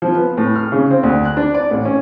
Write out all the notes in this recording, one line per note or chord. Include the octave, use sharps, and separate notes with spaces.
F3
B3
A2
F6
C#3
C4
D2
F#6
D4
D5
A1
C#4